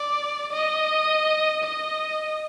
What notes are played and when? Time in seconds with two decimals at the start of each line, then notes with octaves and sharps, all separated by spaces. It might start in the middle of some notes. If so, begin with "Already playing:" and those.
Already playing: D5
0.52 D#5
1.64 D#5